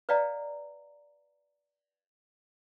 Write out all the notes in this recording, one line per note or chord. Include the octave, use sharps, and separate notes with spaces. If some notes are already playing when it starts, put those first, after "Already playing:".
B4 D5 D#5 F5 G5 A#5